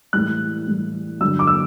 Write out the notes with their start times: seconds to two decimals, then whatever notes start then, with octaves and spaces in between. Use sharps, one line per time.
0.13 A2 E3 G3 F#6
0.67 A2 E3 G3
1.21 G2 D3 F#3 E6
1.39 D6
1.47 E6